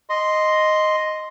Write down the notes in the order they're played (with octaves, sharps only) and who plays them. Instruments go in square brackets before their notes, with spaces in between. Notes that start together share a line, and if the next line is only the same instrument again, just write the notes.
[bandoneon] D#5 C6